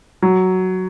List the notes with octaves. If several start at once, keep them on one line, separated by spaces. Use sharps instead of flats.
F#3